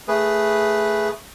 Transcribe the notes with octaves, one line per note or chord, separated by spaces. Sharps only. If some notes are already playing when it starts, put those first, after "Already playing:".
A3 G#4 B4